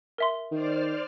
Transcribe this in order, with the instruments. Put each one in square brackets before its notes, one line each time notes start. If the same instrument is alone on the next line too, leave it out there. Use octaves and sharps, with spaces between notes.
[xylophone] A#4 E5 C6
[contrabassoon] D#3 [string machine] C5 D5 F6